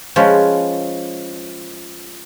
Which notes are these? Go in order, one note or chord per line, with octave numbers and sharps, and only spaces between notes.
F3 G#3 C#4 B4 C#5